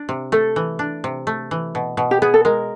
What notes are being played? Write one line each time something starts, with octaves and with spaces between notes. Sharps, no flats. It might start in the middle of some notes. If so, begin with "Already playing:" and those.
Already playing: D4
C3
A3 A4
E3
D4
C3
A3
E3
B2
B2
G4
B3 G#4
A4
G#3 A#4